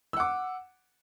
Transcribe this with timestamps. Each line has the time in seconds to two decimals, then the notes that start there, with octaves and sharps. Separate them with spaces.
0.13 E6
0.17 F#5
0.20 D6